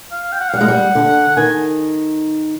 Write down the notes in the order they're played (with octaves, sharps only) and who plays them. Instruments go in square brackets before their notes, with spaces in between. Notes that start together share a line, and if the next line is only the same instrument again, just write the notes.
[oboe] F5
G5
F#5
F5
[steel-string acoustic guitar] G3
[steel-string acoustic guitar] G#3 [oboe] F#5
[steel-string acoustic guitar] G3
D3
[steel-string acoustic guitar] D#3 [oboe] G#5